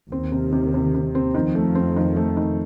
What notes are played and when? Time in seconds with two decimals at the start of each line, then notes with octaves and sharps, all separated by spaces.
0.11 D#2 D#3 C4
0.32 C3
0.52 C3
0.74 C3
0.94 C3
1.15 C4
1.35 F2 D#3 F3
1.55 A3
1.75 C4
1.96 D#3
2.16 A3
2.37 D#3